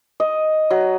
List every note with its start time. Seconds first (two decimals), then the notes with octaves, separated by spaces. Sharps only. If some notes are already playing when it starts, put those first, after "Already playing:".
0.20 D#5
0.71 F#3